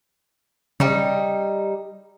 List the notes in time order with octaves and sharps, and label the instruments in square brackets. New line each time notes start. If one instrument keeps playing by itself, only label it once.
[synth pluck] C#3 [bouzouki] G3 D#4